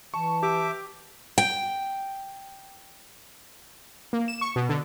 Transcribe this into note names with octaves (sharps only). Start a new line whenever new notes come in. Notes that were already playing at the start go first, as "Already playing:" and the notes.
E3 A5 C#6
G4 E5 D6
G5
A#3
E7
C#6
B2
D3